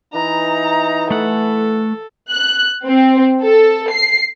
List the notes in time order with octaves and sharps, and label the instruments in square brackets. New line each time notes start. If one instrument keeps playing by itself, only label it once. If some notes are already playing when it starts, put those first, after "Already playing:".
[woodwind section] E3 [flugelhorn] D#4 [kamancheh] A#5
[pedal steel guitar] A3 F#5 [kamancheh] A4
[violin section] F#6
C4
A4
C7